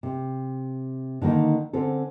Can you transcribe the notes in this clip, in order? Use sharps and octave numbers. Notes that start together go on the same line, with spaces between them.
C3
D3 D#3 A#3 D#4
D3 C4 C#4 A4